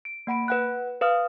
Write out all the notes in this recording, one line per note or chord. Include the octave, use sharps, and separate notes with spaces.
D7
A#3 F#5 B5 D7
B4 F#5 F#6
B4 F5 D#6 F6